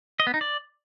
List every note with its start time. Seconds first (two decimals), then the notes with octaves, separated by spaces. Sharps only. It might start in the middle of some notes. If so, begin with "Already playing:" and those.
0.20 D#5
0.27 B3
0.34 D#4
0.41 D5